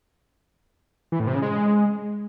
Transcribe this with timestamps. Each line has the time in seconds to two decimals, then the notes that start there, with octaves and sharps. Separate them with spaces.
1.12 E3
1.20 A2
1.27 C3
1.35 C#3
1.42 G#3